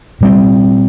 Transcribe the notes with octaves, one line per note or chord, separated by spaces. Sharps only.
A#2 G3 C4